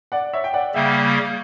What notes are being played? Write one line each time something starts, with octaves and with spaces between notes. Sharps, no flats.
D5 F#5
C#5 E5
G5
D5 F#5
C#3 G3 A#3 E5 G5